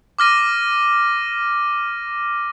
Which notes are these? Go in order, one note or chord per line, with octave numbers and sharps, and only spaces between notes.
D6 F6 A#6 D#7